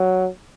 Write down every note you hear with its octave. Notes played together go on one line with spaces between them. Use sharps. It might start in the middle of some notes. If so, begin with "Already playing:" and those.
Already playing: F#3